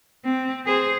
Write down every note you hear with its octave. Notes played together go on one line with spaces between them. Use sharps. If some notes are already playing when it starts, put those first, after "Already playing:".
C4
G#4 C5